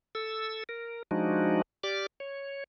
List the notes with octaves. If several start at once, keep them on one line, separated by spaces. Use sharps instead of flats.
A4 E6
A#4
F3 G#3 D4 D#4 F#4
G4 D5 D6 F6
C#5